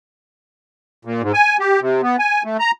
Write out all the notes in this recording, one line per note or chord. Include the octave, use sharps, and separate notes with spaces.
A#2
G#2
G#5
G4
C3
B3
G#5
A3
A#5